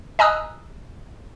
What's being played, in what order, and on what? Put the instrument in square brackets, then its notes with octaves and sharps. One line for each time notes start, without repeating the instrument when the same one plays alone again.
[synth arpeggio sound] D#5 G#5 A#5 D#6 E6 F#6